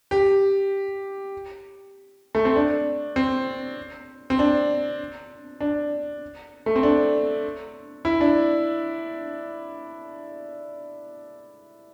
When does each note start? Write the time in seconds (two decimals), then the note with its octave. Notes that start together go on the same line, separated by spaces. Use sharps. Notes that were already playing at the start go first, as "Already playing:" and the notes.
0.11 G4
2.35 A3
2.45 C4
2.56 D4
3.16 C4
4.30 C4
4.39 D4
5.60 D4
6.66 A3
6.76 C4
6.83 D4
8.05 E4
8.21 D4